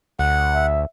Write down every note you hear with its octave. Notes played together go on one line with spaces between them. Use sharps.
D2 F#5
E5